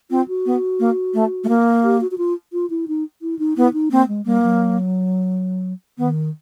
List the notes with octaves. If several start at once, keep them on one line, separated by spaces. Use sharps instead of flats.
C4 F4
F#4
B3
A#3
A3
A3
A#3
G4
F#4
F#4
F4
F4
E4
D#4
E4
D#4
B3 E4
D#4
A#3 C4
G#3
G3 A#3
F#3
D#3 B3